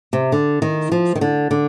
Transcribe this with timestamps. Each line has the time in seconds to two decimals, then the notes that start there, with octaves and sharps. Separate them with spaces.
0.13 C3
0.32 D3
0.62 D#3
0.92 F3
1.15 D#3
1.21 D3
1.51 D3